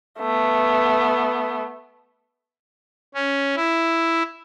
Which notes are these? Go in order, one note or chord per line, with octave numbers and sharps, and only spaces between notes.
A3 B3
C#4
E4